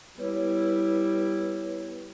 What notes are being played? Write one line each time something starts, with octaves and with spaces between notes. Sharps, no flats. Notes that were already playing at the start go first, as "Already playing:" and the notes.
G3 B3 E4 B4 C#5